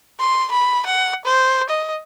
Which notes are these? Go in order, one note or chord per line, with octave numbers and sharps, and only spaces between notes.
C6
B5
F#5
C5
D#5